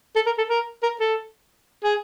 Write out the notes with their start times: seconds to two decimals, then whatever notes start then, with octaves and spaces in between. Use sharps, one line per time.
0.16 A4
0.26 A#4
0.38 A4
0.49 A#4
0.83 A#4
1.00 A4
1.84 G#4